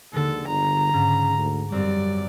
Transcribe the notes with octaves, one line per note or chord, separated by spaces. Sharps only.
D#2 D3 G#3 A4
G1 A#5
G#2 C#3
D2
F#2 G3 C4 D5